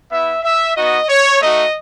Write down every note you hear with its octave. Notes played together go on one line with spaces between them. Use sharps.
B3 E4 E5
E5
B3 D#4 F#4 D#5
C#5
A3 D#4 F#4 D#5